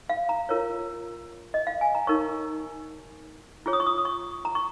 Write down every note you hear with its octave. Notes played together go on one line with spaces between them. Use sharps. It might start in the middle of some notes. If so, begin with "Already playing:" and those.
F5
A#5
F4 A#4 C#5
D#5
F5
G#5
A#5
D#4 A#4 C#5 C#6
F4 G#4 C#5
D#6
C#6
D#6
D#6
C#6
A#5
C#6